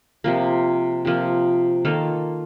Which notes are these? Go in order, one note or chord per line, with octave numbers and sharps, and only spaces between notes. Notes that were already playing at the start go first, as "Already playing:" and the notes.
C3 F3 A#3
C3 F3 A#3
D#3 A#3 F4 A4